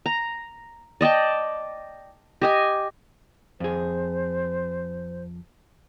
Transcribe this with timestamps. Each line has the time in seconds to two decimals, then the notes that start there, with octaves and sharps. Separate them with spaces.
0.06 A#5
1.01 D5 D#5 G5 A5
2.41 G4 D#5 G#5
3.60 F2 G#4 C5